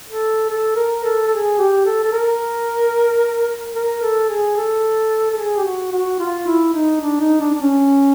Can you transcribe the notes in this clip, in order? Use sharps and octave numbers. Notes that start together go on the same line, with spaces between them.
A4
A4
A#4
A4
A4
G#4
G4
A4
A4
A#4
A#4
A4
G#4
A4
A4
G#4
G4
F#4
F#4
F4
E4
D#4
D4
D#4
D4
D4
C#4